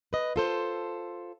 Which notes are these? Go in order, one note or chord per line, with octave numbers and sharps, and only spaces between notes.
B4 D#5
F4 A4 C5